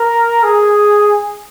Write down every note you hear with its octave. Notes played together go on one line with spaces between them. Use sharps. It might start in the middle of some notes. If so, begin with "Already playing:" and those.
Already playing: A#4
G#4